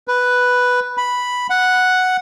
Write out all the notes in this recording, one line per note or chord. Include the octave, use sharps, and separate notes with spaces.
B4
B5
F#5